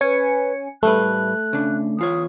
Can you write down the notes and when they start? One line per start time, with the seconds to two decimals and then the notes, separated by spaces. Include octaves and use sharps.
0.01 C#4 B4 G#5 C#7
0.83 A2 G3 A3 B4 F#6
1.53 C#3 D4
1.98 E2 F4 C#5 D#6